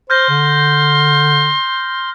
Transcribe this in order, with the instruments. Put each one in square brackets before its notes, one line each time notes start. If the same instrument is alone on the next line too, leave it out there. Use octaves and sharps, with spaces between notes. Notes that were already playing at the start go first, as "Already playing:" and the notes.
[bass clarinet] C5 [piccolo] C6 [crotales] F6 G6 A#6
[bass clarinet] D3